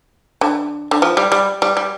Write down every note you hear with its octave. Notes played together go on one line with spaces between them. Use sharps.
D3
D3
F3
G3
G3
G3
G3